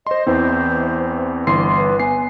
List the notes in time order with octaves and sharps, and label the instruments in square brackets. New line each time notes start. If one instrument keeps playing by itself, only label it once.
[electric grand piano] C5 C6 [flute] D#5
[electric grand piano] E2 E3 C4 [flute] C5
[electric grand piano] G1 E3 C7 [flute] C6
[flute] B4
[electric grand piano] B3 C7 [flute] G#5